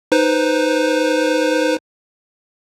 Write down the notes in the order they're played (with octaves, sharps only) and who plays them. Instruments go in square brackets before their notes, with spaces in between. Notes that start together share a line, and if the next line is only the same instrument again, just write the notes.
[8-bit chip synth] D#4 B4 C5